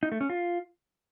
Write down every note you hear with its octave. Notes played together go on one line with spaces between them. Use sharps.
D#4
A3
C#4
F4